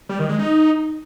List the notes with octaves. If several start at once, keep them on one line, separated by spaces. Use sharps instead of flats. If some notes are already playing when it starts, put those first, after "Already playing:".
G3
D#3
G#3
D#4